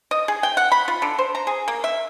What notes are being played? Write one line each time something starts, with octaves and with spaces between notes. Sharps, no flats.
D#5
G#4
G5
F#5
B5
F4
D3
C5
A#5
G#4
A#3
E5